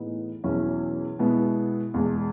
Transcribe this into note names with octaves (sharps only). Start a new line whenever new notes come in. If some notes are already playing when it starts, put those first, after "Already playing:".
Already playing: A2 E3 B3 D#4 G#4
E2 B2 F#3 C#4 E4
B2 G#3 B3 E4
E2 B2 G#3